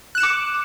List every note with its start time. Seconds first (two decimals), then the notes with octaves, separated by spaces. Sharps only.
0.15 F#6
0.18 E7
0.20 C#7
0.23 D6